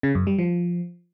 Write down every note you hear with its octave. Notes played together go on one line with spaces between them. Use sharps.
C#3
F#2
G3
F3